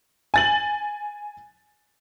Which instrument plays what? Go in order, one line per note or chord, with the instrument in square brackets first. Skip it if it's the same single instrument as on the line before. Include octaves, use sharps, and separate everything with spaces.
[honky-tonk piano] G#5 A6 F#7